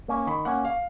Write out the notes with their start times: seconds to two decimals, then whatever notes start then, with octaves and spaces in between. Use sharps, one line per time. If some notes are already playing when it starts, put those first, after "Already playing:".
0.08 A#3 C#4
0.27 D#3 B5
0.45 A#3 C#4 F#5
0.65 F5